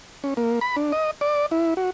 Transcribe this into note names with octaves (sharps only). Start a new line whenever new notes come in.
C#4
A#3
B5
D4
D#5
D5
E4
F#4